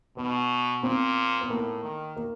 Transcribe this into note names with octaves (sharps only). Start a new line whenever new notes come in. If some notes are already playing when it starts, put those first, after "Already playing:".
B2 B3
A#2 C4
B3
A2 A#3
D#3
A#3